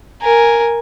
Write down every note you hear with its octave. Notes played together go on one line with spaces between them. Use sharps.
A#4 G#5